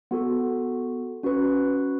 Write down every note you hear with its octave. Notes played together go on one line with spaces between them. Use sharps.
B3 F#4 A4
C#4 F#4 B4